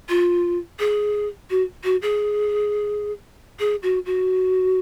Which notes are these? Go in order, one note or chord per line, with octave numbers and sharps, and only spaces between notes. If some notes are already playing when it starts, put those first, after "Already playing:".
F4
G#4
F#4
F#4
G#4
G#4
F#4
F#4